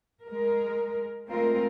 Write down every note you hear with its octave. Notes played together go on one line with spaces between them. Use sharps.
G#3 A#4
G#3 A3 C4 F4 A#4